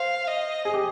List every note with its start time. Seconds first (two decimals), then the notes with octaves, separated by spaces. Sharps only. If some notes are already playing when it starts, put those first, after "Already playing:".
Already playing: C5 F5
0.27 D#5
0.65 G#4
0.74 G4